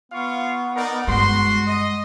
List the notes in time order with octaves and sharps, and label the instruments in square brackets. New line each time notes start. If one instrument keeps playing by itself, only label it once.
[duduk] B3 [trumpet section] F4 F5 C#6
[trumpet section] D#4 A#4 D5
[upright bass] G2 G#3 [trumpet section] F#4 C6
[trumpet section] D#5